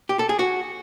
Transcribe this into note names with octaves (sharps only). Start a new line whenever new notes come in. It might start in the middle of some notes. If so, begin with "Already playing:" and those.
G4
A4
G#4
F#4